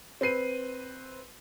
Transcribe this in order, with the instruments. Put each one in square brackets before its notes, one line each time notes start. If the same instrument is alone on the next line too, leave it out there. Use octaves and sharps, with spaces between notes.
[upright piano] C4 B4 C7 D#7